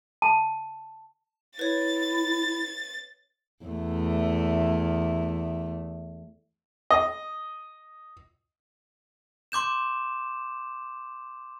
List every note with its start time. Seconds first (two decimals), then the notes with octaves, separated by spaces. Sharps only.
0.22 A5
1.59 E4 B4 C#5 A6
3.65 E2 A3
6.91 D#5
9.52 C6 D6 G6 E7